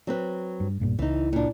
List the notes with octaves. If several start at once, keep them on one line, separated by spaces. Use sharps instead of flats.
F#3 C4 B4
G2
B1 G2 A#2
C#2 E3 D#4
A#2 D4